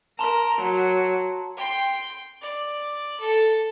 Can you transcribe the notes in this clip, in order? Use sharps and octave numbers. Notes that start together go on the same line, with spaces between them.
A#4 A5 A#5 C6
F#3
G5 C6
D5
A4